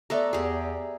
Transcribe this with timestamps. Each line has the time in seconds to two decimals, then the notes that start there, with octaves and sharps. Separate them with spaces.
0.10 A3 B3 A4 D5 E5 A#5
0.33 E2 G4 G#4